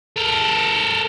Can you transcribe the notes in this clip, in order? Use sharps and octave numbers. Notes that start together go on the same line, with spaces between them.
A4 A#4